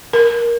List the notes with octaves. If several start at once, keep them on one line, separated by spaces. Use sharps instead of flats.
A#4